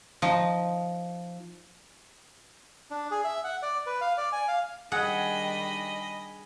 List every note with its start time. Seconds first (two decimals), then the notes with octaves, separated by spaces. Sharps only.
0.22 F3 D#4
2.91 D4
3.11 G#4
3.24 E5
3.44 F#5
3.63 D5
3.87 B4
4.01 F5
4.18 D5
4.32 G#5
4.48 F5
4.92 D#3 G3 D4 G#4 D#5 F#5 B5